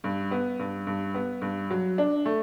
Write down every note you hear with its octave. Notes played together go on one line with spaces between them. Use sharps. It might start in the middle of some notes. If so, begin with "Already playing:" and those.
G2
B3
G2
G2
B3
G2
F#3
D4
A3